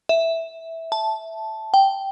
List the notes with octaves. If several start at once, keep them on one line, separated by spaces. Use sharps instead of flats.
E5
A5
G5